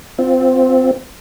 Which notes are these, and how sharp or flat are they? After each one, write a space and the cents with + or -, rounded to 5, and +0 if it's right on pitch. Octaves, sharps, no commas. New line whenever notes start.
C4 -15 F4 +10